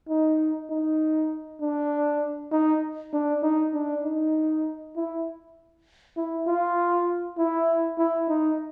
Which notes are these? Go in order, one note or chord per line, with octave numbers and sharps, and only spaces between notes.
D#4
D#4
D4
D#4
D4
D#4
D4
D#4
E4
E4
F4
E4
E4
D#4